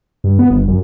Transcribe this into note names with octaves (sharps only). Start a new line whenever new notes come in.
G2
B3
G1
F#2